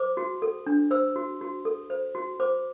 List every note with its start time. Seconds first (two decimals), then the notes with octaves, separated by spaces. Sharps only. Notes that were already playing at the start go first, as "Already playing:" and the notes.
Already playing: C5 D6
0.17 F#4
0.42 A4
0.66 D4
0.91 C5 E6
1.16 F#4
1.41 F#4
1.65 A4
1.90 C5
2.15 F#4
2.40 C5 D6